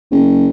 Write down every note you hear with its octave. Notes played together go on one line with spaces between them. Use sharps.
F#1